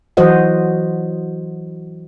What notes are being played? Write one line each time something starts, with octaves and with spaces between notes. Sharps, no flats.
E3 F#3 F#4 C5 D#5 F#5